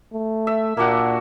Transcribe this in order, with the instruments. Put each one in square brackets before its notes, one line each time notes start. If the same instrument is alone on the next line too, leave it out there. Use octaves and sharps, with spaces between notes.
[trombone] A3
[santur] E5
[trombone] A#2 [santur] A#3 D4 F#4